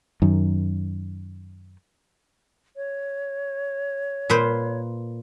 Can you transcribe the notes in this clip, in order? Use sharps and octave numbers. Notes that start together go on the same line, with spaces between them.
F#2 D#3
C#5
A#2 B4 C5